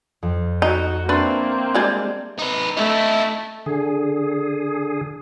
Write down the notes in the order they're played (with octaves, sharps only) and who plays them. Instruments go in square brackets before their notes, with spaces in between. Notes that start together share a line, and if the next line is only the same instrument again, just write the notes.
[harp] F2
[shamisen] D#4 [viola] F#4
[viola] A#3 C4 [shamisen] D4 B4 [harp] E5 C6 C#6
[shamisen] G3 G#3 D4
[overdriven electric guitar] D#4 B4
[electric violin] A3 [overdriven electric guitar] D#4 E4
[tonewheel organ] D3 G#4